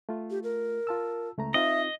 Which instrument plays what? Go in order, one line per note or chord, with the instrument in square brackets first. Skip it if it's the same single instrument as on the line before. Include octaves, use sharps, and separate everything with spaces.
[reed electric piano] A3 F4
[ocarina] G4
A#4
[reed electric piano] F4 A5 E6
C#2 A3 A#5
[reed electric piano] C4 D#4 F4 [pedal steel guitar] D#5 [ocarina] E5